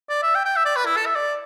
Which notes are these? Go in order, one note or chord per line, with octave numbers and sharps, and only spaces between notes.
D5
E5
G5
G5
E5
D5
B4
E4
A4
E5
D5